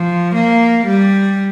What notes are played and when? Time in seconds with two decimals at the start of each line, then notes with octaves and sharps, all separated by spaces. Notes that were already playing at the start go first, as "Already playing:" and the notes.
Already playing: F3
0.35 A#3
0.86 G3